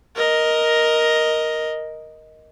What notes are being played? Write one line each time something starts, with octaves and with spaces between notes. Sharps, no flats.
A#4 D#5